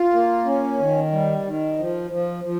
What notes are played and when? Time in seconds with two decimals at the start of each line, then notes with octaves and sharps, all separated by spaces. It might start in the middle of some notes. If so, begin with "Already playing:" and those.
Already playing: F4
0.13 A#3
0.45 C#4
0.79 D#3
1.12 G3
1.45 D#3
1.78 F3
2.11 F3
2.44 F3